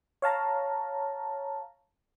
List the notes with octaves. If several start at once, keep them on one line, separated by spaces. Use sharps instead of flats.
C#5 F5 A5 A#5